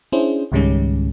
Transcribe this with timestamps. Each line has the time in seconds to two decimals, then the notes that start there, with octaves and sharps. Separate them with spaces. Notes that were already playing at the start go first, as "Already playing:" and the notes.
0.12 C#4 D4 E4 G#4 C5
0.52 C#2 G#2 D#3 G3 G#3 C#4